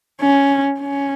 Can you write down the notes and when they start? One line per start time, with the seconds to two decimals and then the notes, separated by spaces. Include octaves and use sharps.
0.21 C#4
0.80 C#4